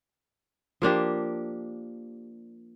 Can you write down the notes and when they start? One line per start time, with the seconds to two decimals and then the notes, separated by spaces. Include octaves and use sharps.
0.82 F3 A#3 D4 G4